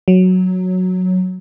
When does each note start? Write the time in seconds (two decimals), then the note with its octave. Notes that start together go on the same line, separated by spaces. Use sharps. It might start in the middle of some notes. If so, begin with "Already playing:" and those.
0.08 F#3